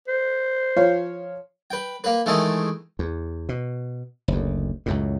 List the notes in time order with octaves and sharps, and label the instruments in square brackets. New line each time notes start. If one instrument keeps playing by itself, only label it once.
[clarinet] C5
[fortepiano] F3 C#5 F5
[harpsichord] B4 G5
A#3 B4
D#3 E3 G#3 A3 A5 D#6
[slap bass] E2
B2
F#1 D2
C#2 F#2 A2